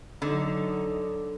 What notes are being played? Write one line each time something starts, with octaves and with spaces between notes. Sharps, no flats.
D3 F#3 D#4